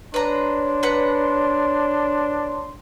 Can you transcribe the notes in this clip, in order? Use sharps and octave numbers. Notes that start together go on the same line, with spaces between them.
D4 B4 C#5 A#5 C6
B4 F#5 A#5